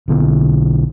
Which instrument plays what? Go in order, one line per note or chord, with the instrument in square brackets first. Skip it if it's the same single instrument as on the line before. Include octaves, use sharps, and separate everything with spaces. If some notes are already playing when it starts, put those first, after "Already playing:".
[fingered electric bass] B1 D3 B3